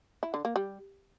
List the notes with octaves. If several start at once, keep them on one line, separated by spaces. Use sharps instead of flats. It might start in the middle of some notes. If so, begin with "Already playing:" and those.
E4
D3
A#3
G3